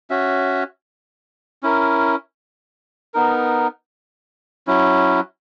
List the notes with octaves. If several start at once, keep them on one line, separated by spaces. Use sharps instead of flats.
C#4 F#4 C#5 E5
C#4 E4 A#4
B3 D#4 A#4
F#3 C#4 E4